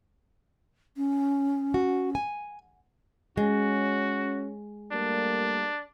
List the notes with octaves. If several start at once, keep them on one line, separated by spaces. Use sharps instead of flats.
C#4
F#4
G#5
G#3 C#4 F#4
G3 A3 A#3 D4